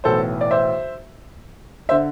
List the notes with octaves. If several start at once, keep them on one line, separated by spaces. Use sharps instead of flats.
B1 A2 E3 A4 C5
D5
C5 E5
D3 C5 E5